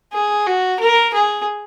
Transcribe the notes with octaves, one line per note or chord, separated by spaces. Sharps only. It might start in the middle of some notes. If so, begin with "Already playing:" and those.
G#4
F#4
A#4
G#4